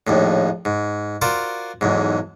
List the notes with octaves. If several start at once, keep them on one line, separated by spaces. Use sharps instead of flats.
A#1 D#2 A2
G#2
F4 F#4 A#4 C5 D5
B1 E2 G#2